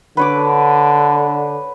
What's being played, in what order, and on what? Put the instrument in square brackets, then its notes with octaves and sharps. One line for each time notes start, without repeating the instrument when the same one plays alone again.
[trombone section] D3 [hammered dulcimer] B4 C#5 D6